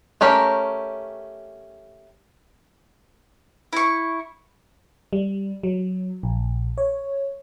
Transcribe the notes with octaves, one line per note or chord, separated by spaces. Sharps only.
A3 C#4 G4 A#4
E4 C#6
G3
F#3
A#1
C#5